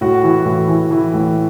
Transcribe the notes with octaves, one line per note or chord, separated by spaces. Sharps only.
A2 F#4
E3
A2
E3
E3
A2